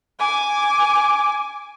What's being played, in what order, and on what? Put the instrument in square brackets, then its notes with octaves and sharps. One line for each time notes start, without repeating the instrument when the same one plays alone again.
[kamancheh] G#5 D6